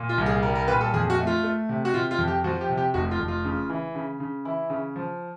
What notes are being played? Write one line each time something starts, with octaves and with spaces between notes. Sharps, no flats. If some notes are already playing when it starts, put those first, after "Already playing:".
Already playing: A#2
F4
C2
G#4
G3 A#4
A#4
A#2 B4
A4
F2 G#4
F#4
A3
F4
A3
C3
F#4
C3 F4
F4
F2
G4
F3 F#4
G4
C3
G4
F1 F#4
F4
F1
F4
C#3
E3
C#3
C#3
E3 E4
C#3
F3